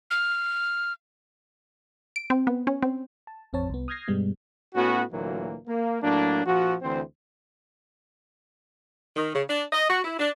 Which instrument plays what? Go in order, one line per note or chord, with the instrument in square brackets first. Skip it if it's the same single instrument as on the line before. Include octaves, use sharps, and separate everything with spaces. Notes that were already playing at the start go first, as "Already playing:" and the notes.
[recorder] F6
[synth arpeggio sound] D7
C4
B3
C#4
C4
[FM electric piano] A5
A1 F2 C4 C#5 A5
C2 B3
D#6 F6 G6 G#6 A#6 C7
G2 B2 G3 G#3 B3
[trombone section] A2 B3 C#4 F#4
D2 A#2 E3 F#3 A#3
A#3
A2 F#3 A#3 D4
A#1 F3 F#4
D2 E3 C4 C5
[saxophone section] D#3
C#3
D4
D#5
F#4
E4
D4